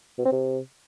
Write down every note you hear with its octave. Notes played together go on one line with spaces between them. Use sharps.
B2
C4
C3